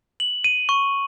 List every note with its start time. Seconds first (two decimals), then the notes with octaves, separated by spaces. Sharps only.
0.20 F#7
0.44 D#7
0.69 C#6